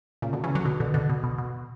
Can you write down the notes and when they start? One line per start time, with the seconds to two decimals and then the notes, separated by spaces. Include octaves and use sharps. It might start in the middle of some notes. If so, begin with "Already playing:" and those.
0.22 A#2 C#3
0.33 B2 D3
0.44 C#3 E3
0.55 D3 F#3
0.65 B2 D3
0.80 B2 D3
0.94 B2 D3
1.09 B2
1.24 B2
1.38 B2